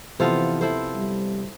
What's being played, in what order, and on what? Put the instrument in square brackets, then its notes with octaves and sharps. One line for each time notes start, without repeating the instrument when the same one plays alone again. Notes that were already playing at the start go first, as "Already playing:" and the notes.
[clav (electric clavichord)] C3 F3 B3 [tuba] E3 [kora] F4 A4 C5
[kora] E4 A4 C5
[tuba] G3